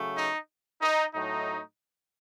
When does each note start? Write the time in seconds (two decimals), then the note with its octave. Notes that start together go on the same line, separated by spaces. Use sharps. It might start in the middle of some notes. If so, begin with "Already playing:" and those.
Already playing: C#3 F#3 A3
0.15 D#4
0.81 D#4
1.14 A2 F#3 A3 D#4